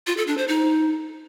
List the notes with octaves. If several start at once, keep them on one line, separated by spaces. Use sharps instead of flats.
F4
A4
D4
C5
D#4